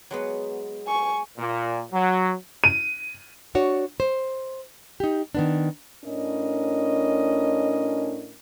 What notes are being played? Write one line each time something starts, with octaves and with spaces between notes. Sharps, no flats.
F#3 G#3 B3
G#5 C#6
A#2
F#3
D#7
D4 F#4 C#5
C5
D#4 G4
D#3 B3 D4
A2 C#4 D4 A#4 D#5